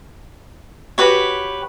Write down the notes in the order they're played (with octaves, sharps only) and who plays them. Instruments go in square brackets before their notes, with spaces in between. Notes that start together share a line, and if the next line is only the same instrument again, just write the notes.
[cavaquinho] F#4 G4 B4 C#5